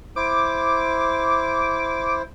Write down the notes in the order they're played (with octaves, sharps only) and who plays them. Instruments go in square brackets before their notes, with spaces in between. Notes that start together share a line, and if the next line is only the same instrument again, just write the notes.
[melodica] E4 C5 [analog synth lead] D6